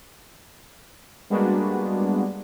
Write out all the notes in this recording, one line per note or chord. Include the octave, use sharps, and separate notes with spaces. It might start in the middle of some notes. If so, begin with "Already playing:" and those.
G3 G#3 A#3 B3 D4 F#4